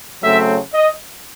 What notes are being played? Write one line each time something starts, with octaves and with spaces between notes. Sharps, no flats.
C#3 F#3 A3 C4 E5
D#5